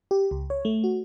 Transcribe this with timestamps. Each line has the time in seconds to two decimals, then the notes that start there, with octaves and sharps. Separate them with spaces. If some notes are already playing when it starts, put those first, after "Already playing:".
0.11 G4
0.31 C#2
0.50 C#5
0.65 A3
0.84 F#4